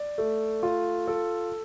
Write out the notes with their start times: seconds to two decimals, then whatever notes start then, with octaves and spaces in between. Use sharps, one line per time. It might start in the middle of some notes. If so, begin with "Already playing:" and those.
Already playing: D5
0.18 A3
0.63 F4
1.07 A4